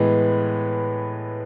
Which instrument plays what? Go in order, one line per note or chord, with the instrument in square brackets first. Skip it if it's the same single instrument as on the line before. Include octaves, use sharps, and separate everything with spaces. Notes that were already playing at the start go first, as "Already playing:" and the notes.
Already playing: [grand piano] A2 E3 G#3 B3